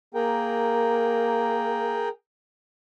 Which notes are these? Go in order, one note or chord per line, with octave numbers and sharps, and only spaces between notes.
A#3 G#4 A#4 G5